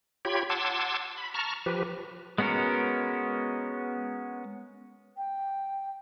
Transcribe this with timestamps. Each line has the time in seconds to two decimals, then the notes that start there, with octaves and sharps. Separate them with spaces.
0.25 F4 G4 C#5 G5 B5 G#6
0.50 F#5 A5 C6 D6 E6 G#6
1.17 B5
1.34 A5 A#5 C#6 F6
1.66 F3 G4 B4
2.38 G#3 B3 C#4 F#4 A#4
5.17 G5